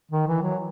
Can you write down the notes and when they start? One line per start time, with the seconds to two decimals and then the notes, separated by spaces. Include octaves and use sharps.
0.12 D#3
0.28 E3
0.43 F#3